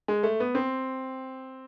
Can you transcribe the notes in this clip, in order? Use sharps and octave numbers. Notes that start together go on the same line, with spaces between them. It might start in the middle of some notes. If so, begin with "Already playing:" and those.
G#3
A3
B3
C4